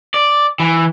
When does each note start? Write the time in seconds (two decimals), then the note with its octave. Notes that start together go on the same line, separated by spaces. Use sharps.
0.14 D5
0.60 E3